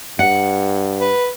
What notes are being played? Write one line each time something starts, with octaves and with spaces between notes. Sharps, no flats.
G2 F#5
B4